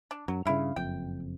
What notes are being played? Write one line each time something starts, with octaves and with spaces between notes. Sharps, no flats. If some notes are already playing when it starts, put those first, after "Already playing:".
D4
F#2 F#3
G2 C#3 E4 F5
F#1 F2 G5